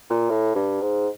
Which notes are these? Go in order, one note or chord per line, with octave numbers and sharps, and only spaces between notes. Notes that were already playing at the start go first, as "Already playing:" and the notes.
A#2
A2
G2
G#2